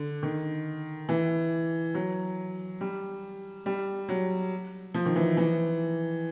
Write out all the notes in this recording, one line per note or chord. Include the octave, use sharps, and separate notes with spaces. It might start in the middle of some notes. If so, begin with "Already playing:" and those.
Already playing: D3
D#3
E3
F#3
G3
G3
F#3
F3
D#3
E3
E3